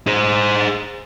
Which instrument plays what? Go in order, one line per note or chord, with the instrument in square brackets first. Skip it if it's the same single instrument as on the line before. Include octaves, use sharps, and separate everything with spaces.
[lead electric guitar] G#4 C5